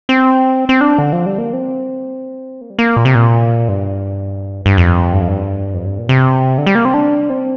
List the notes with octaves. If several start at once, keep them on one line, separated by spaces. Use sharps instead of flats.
C4
C4
D4
D3
F3
G3
A#3
C4
A#3
G3
A#3
A#2
C3
A#2
G2
G2
F2
G2
F2
G2
F2
G2
A#2
C3
D3
G3
A#3
C4
D4
C4